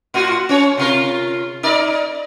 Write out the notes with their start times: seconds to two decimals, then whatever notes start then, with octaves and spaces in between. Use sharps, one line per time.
0.14 A2 F4 F#4
0.49 C#4 C#5
0.77 C3 F4 A#4
1.63 D#4 A#4 D5